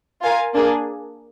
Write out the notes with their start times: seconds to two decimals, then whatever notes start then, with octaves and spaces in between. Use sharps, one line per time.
0.21 F4 A#4 F5 G#5
0.54 A#3 D4 G#4